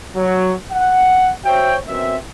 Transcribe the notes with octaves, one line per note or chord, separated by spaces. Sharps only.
F#3
F#5
F#4 C5 C#5 E5 G5
F#2 B2 C4 E5